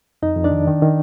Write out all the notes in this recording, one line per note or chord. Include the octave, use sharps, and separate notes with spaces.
F2 D#4 D#5
F2
D4 D5
D#3
D#3
D#3